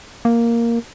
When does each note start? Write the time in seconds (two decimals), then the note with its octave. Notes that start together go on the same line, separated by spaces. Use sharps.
0.25 A#3